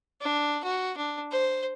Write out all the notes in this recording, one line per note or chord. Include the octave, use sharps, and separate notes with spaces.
D4
F#4
D4
C5